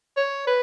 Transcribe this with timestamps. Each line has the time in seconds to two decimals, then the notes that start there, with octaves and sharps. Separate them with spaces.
0.17 C#5
0.47 B4